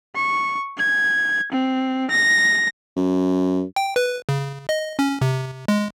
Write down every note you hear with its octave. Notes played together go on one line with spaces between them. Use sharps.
C#6
G#6
C4
A#6
F#2
G5
B4
C#3
D#5
C#4
C3
G#3